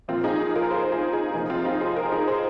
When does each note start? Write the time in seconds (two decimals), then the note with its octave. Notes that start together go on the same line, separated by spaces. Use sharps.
0.08 A#2 F3 A#3 C4 F4
0.24 D#4 G#4
0.40 D#4 G#4
0.55 F4 A#4
0.71 G#4 C5
0.92 D#4 G#4
1.13 D#4 G#4
1.34 C3 F3 A#3 D#4
1.50 C4 F4
1.65 D#4 G#4
1.81 G#4 C5
1.96 F4 A#4
2.12 D#4 G#4
2.27 G#4 C5